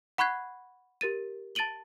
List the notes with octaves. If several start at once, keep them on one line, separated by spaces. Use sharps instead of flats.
F#5 B5 C#6 F#6 G#6 C7
G4 A#4 A6 D#7
A5 A6 D7 D#7 F#7 G7